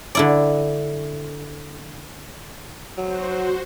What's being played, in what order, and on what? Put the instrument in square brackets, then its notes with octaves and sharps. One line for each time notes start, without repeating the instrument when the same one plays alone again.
[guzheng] D3 E4 D5
[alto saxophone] F#3 [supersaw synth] F#4 C5